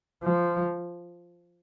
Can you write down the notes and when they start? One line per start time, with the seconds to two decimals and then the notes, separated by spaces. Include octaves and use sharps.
0.23 F3